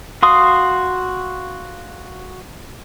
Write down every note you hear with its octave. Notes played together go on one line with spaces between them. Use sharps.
F#4 F5 C6 D#6